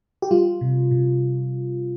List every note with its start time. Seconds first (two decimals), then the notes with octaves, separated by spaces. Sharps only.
0.22 G4
0.31 G3 F4
0.61 C3
0.91 C3